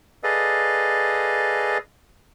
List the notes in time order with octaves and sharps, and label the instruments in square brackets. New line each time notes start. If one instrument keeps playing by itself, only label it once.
[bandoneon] G#4 A4 B4 D5 D#5 F5